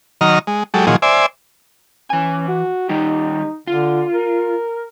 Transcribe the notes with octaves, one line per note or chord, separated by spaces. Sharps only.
D#3 F#3 D#5 A#5 F6
G#3
F#3 G#3 G4 A4
A#2 D#3 F3 F#3 G#4
C5 D5 E5 G#5
E3 C#4 G#5
F#4
D#3 G3 D#4 G4
D3 F4
A#4